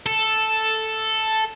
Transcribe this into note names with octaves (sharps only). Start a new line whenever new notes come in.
A4